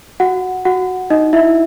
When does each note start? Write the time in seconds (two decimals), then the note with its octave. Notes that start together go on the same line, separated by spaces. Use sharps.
0.20 F#4 F#5
0.65 F#4 F#5
1.10 D#4 D#5
1.33 E4 E5